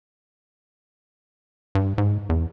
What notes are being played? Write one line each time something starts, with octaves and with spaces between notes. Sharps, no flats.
G2
G#2
E2